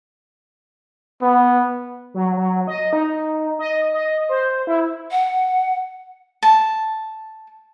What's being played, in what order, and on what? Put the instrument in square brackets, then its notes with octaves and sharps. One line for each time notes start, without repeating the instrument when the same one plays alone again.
[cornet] B3
[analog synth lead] F#3
F#3
D#5
D#4
D#5
D#5
C5
E4
[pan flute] F#5
[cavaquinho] A5